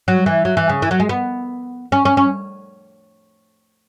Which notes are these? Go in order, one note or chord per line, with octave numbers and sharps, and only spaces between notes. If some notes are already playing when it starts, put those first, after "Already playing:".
F#3
E3
F#3
E3
C#3
E3
F#3
G#3
B3
C#4
C#4
C#4